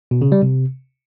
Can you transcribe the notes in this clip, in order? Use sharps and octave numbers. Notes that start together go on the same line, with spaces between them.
B2
C#3
G3
C3